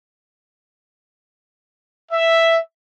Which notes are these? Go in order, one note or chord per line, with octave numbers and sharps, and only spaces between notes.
E5